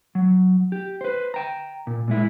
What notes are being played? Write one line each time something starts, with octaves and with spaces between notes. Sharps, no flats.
F#3
G4
B4 C5
G5 A#5
A#2
A#2 G#3 E4